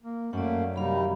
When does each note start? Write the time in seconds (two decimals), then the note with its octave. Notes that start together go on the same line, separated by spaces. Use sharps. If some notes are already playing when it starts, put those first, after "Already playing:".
0.03 A#3
0.33 F#2 A3 A#3 C#4 D5 F#5
0.76 C3 D#3 G3 D#4 F5 B5